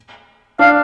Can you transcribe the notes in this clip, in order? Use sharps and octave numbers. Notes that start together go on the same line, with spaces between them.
D4 F5